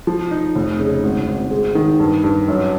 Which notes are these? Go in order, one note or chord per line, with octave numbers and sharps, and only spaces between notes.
F3
D#4
F1
C#3
G#1
G#1
G#3
D#3
G2
G2
F#2